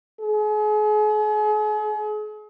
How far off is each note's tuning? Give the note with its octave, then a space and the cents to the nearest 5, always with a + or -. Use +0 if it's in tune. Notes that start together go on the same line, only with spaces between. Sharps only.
G#4 +40